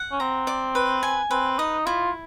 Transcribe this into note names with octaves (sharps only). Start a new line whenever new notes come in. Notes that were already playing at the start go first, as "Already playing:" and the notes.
Already playing: F#5
C#4
C4 A#5
D5
B4
G#5
C4 B4
D#4 D#5
E4 F4